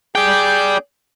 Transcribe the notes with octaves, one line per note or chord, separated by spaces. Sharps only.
G#4 D5 G5 D6 G6